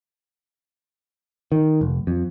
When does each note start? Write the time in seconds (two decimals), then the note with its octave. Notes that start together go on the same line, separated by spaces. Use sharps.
1.52 D#3
1.81 F1
2.07 F2